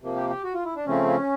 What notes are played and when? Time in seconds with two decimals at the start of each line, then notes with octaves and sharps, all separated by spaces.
0.02 C3 F3 A#3
0.16 G4
0.30 G4
0.44 F#4
0.54 F4
0.65 E4
0.76 D4
0.86 C#3 F3 A3 C4 C#4
1.07 C#4